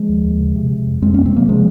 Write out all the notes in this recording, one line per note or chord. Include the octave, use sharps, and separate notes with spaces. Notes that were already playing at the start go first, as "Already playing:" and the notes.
Already playing: F3 G#3
D#2
D#2
C#3
C3
C3
F2
F2 G#3 C4
C3 A#3 C#4
G#3 C4
C3 F#3 A#3
C3 F3 G#3